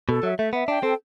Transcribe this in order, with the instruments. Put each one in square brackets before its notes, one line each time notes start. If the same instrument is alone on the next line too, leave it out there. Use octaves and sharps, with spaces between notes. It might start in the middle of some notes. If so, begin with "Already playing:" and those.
[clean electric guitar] B2 [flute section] A4
[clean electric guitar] F#3 [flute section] E5
[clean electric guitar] A3 [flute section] E5
[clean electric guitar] B3 [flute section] E5
[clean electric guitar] D4 [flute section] G5
[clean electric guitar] C4 [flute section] A4